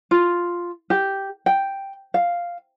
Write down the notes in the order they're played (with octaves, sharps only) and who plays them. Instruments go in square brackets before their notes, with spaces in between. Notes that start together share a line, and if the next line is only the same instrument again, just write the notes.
[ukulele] F4
G4
G5
F5